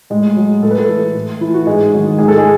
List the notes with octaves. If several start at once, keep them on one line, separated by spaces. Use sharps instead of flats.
A2 G#3 G#4
F#3
A2 A4
B4
A3 A4
E3
A2
E3 E4
F#4
G#2 G#3 G#4
D#3 F#3
G#2 G#4
A4
G#3 G#4